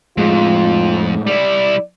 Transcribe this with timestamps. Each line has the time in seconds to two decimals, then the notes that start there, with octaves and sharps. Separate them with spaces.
0.17 F2 A2 G#3 F4
1.27 G3 E4 D5